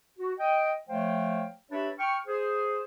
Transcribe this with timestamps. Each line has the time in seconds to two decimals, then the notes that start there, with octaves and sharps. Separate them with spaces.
0.19 F#4
0.39 D#5 G5
0.89 F3 A3 C5 C#5 F5 G5
1.72 D4 G4 B4 C#5 E5 B5
1.99 G5 C#6 F6
2.27 G#4 C5